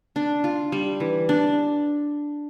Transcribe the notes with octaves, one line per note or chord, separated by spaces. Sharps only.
D4
F4
G3
E3
D4